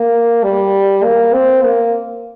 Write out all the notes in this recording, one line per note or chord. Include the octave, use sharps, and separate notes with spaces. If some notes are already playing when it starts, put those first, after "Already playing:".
Already playing: A#3
G3
A#3
C4
A#3